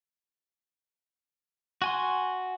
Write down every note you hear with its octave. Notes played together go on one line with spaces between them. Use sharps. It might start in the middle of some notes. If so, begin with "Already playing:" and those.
F#4 G#5 C6